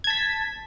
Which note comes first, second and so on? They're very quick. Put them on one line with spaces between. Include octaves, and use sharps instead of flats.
G#6 A5 B6